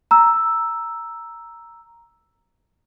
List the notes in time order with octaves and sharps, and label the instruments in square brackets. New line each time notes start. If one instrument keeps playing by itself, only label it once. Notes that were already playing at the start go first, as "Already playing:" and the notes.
[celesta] A#5 E6